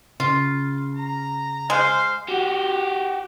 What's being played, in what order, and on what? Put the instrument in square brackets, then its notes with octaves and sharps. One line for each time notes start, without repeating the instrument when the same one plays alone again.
[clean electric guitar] C#3 [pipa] F4
[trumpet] A#5
[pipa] G#3 [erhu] C5 [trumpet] F5
[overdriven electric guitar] F#4 G4